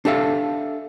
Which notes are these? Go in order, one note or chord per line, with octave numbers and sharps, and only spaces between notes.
D4 G4 A4 E5 F5